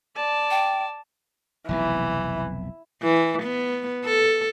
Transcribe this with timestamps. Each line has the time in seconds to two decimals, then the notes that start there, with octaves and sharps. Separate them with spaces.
0.16 D5 A5
0.50 G5
1.69 F1 B1 C3 E3
3.03 E3
3.43 B3
4.05 A4